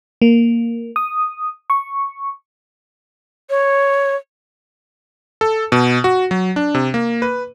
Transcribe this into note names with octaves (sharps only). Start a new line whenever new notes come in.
A#3
D#6
C#6
C#5
A4
B2
F#4
F#3
D4
C3
A#3
B4